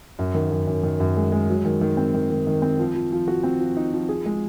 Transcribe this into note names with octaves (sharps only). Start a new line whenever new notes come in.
F#2
D#3
F#2
F#2
D#3
F#2
G#3
G#3
F#3
D#3
D#3
C4
D#3
D#3
D#3
C4
F3
F3
F3
F#4
C4
F3
D#4
F3
G#4
G#3